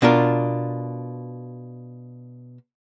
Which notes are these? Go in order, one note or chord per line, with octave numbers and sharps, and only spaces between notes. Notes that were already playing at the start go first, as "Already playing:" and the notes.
B2 D4 F4 A#4